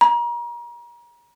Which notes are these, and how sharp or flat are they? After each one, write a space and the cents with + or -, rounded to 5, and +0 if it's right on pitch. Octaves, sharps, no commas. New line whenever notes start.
A#5 +35